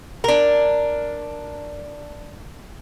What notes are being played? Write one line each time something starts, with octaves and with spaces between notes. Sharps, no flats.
D4 A#4